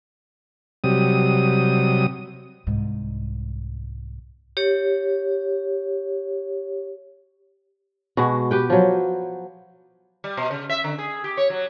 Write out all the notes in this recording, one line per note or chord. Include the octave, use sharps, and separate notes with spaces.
C3 F#3 G3 D#6
C2 G#2
G4 C#5
B2 G#3 F#4
G4 B4 G5
F3 F#3
G3
B2
C#3
E5
D3
G#4
G4
C#5
F#3